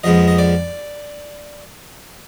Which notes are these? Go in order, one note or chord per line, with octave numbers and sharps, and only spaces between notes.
F2 F3 G#3 B3 D#5
D#5
D5